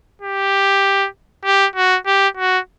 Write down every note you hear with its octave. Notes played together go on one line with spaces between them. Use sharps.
G4
G4
F#4
G4
F#4